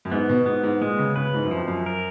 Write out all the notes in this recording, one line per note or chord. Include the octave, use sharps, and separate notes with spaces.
F#2
G#2 B3
B2
G#2 B3
G#2
A#2 G#3
C#3
C#3 B4
G#2
F#2
F3
F2
F#2
A#4